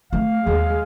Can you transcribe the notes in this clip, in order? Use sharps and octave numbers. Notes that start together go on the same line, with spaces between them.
A3 F5
D#2 G#3